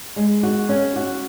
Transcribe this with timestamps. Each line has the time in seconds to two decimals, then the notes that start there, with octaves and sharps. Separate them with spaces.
0.16 G#3
0.43 F#4
0.69 C#4
0.96 F#4